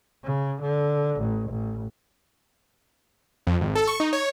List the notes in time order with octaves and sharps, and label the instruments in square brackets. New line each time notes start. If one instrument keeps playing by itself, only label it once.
[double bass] C#3
D3
A1
A1
[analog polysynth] F2
G#1
A4
C#6
D#4
C#5